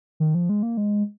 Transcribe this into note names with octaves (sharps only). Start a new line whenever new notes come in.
D#3
F3
G#3
A#3
G#3